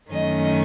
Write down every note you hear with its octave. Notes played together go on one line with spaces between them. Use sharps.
F#2 D#3 F#3 A3 C#4 D#5